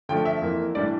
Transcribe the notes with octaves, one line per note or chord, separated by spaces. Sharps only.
D3 F3 A3 G5
E5
F2 E3 A#3
A2 E3 G3 D4 D5